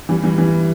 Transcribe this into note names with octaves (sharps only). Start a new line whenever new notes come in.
E3 G3
E3 G3
E3 G3